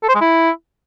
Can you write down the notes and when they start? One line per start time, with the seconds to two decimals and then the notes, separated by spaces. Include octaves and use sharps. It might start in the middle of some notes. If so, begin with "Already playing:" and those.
0.03 A4
0.09 C5
0.15 G#3
0.21 E4